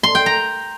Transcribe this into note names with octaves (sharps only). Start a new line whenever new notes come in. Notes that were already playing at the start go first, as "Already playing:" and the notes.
C6
G5
A#5